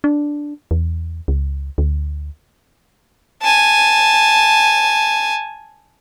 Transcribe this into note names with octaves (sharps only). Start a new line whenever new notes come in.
D4
E2
C#2
D2
G#5 A5